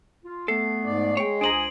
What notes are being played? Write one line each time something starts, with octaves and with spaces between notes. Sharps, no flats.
F4
A3 B3 A4 C7
G#2 D5
G#3 C#5 G5
C#2 D4 C5 G#5 A#5 D#6 D7 F#7